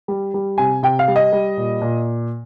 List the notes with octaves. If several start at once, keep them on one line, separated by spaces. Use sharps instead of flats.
G3
G3
C3 G#5
C3 G5
F5
G3
D#5
G3
A#2
A#2